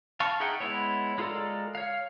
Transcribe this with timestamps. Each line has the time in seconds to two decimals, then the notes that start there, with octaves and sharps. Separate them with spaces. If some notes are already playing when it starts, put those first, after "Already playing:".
0.20 F5 A5 C#6
0.40 D#4 G#4 E5 F#5 G5
0.60 G#3 B3 E4 C#5
1.18 G#3 F4 A4 A#4 D5
1.75 C#5 F5